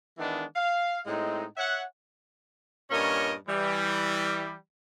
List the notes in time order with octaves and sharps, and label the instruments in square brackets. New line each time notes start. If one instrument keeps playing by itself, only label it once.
[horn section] D#3 E3 G#3 B3 D4
F5
A2 G#3 C4 D#4
C#5 E5 F#5
G2 A#2 C#4 A#4 C#5 D#5
E3 G3